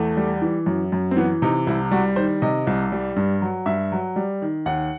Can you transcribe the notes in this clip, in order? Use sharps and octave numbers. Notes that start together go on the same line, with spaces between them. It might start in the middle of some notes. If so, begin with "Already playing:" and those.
Already playing: E2 A3
G3
E3
F#2
F#2
C4
E3 B3
C3 D#4
C2 E4
G3 F#4
D#3 C5
C3 D#5
C2
G3
G2
F#3
G2 E5
F#3
G3
D#3
D#2 F#5